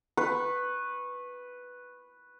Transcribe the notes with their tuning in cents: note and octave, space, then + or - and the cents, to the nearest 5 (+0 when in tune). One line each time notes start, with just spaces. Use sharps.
B4 +0 C#6 -20